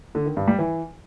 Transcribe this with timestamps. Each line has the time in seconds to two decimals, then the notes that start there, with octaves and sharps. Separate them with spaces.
0.15 D3
0.26 D#3
0.37 G2
0.48 G3
0.59 E3